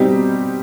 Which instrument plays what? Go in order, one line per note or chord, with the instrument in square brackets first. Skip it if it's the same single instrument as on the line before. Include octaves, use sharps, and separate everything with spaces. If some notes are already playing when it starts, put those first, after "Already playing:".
Already playing: [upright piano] B2 G3 C4 D#4 G4